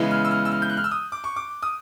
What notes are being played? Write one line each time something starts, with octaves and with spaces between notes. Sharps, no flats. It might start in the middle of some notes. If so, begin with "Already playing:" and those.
Already playing: C#3 E3 G#3 B3 E4
F6
E6
F6
E6
F6
G6
F#6
F6
E6
D#6
D6
C#6
D6
D#6